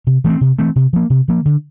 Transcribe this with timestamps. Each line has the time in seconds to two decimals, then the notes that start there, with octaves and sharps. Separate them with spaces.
0.07 C3
0.24 E3 A3 C4
0.41 C3
0.59 E3 A3 C4
0.76 C3
0.93 F3 A#3
1.10 C3
1.28 F3 A#3
1.45 D3